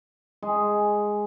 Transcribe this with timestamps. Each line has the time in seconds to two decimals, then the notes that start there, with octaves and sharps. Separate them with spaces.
0.42 G#3 G#4